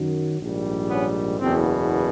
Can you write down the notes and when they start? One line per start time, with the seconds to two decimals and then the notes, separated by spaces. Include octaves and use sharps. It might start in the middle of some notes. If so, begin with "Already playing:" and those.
Already playing: F#2 D#3 F#3
0.40 A#1 G#2 D#3 G3
0.90 B3 C#4
1.40 F#1 E2 B2 C4